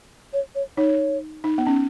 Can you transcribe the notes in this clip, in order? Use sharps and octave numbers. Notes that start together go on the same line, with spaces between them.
C#5
C#5
D#4 C#5
D#4
B3
C#4